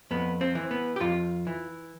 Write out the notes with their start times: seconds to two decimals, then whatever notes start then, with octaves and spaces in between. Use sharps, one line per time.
0.11 F2 B3
0.41 C4
0.55 E3
0.71 B3
0.96 G4
1.01 F2 F4
1.47 E3